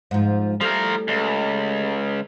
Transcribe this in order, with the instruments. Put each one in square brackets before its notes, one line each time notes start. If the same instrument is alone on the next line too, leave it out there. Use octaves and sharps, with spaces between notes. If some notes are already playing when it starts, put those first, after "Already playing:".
[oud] G#2 F3
[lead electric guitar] F3 A#4 [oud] G3 A3 E4
[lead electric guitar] C#2